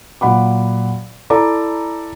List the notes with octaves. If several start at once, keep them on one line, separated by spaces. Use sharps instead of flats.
A#2 F#3 F#5 B5 D6
E4 A4 D5 A#5 D6